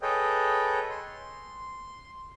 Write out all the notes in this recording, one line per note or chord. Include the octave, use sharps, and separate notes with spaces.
G#4 A4 B4 C#5 D#5 G5
C6